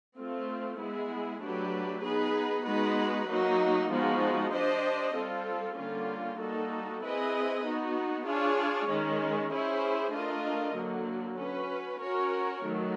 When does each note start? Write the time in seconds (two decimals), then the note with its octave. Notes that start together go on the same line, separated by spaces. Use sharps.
0.17 A3 C4 F4
0.79 G#3 B3 E4 G#4
1.42 F#3 A3 D4 G4 B4
2.03 B3 D#4 G#4 B4
2.66 G#3 B3 D#4 F#4 B4
3.28 F#3 A#3 D#4 F#4
3.91 F3 G#3 B3 D#4 F#4
4.53 D4 G4 C5 D#5
5.15 G3 C4 F4 A4
5.77 D3 G3 A#3 C#4 F4
6.39 G3 A#3 D#4 F#4 A4
7.02 C4 E4 G#4 B4 D#5
7.64 B3 D#4 F#4
8.27 D4 F4 G#4 C#5
8.89 D#3 G#3 C#4
9.51 C#4 E4 G#4 C5
10.13 A3 D4 F4 A#4 D#5
10.76 D3 F#3 A#3
11.38 C#4 F#4 B4
12.00 C#4 F#4 A#4 C#5
12.63 D#3 F#3 A3